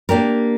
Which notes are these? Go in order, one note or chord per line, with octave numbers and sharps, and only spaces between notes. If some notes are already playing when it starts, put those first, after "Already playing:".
A#3 D4 G4 A#4